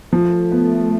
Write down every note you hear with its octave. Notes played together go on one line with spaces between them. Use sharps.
F3 A3
B3